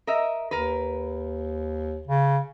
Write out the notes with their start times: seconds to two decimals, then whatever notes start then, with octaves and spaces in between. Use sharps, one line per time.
0.07 A#4 D#5 E5
0.51 D#2 A#4 B4
2.07 C#3